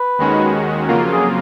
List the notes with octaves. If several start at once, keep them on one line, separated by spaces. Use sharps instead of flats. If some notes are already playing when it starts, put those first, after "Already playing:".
Already playing: B4
D#2 D#3 G#3 C#4 F#4
F2 C#3 F#3 A#3 F4 A#4
G#4